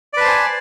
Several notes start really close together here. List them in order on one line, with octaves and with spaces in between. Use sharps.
D5 B4 A5 C5 G#5